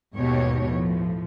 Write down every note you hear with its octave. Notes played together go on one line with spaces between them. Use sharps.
D#2 G#2 B2 G#3 G4 C#5
A2 F3